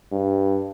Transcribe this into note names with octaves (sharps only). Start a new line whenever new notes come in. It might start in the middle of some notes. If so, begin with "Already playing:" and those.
G2